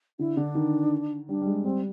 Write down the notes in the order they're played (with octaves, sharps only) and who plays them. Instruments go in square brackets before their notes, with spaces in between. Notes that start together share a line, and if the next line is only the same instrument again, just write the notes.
[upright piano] D3 [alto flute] E4
[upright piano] D3 [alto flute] D4
[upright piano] D#3
[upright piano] G3 [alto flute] D4
[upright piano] G3
G#3
[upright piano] G3 [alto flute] C4